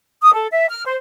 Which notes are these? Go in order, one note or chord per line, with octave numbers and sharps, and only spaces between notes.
D#6
A4
E5
F6
C5